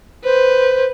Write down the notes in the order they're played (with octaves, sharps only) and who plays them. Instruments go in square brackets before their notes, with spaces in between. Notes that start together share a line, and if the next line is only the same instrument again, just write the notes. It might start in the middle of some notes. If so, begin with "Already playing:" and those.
[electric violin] B4 [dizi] C5